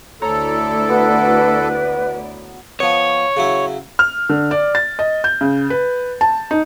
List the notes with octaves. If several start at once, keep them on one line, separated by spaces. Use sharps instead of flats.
D2 E4 A4 C#5 D5 A#5 C#6
B3 F#4 B4 F#5
F3 B3 C#5
C#3 F#3 E4
F6
D3
D5
A6
D#5
G6
C#3
B4
A5
D#4